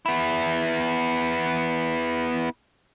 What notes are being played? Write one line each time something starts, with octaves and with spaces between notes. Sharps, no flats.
B3 E4